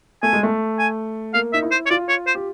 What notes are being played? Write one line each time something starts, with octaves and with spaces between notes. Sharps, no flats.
A3 G#5
G#3
A3
G#5
A#3 F5
D#4 E5
E4
C5
C#5
F4 D5
C#5
C5
G4